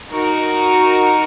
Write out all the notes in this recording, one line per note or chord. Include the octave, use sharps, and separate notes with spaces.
D#4 F#4 A#4